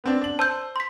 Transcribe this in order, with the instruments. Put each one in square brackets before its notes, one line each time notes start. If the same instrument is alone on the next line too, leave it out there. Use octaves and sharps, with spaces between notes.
[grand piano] B3 C4 D4
D4 F#7
[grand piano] C5 [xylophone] A5 E6 G6
[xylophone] C6 B6